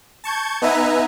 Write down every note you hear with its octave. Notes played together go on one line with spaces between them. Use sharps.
A5 C#6 G6 G#6
B3 D#4 B4 E5 G#5 A#5